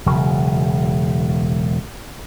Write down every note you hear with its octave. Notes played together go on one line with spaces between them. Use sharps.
E1 C#3 F#3